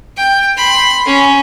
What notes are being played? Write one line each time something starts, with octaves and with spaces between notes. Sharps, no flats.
G5
B5 C6
C#4